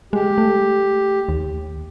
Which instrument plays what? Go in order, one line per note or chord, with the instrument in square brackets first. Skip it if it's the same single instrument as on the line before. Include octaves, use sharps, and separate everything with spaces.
[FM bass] G#3 [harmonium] G4
[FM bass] A3
D#2